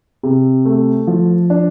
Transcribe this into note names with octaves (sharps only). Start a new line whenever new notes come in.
C3
A3
F3
D4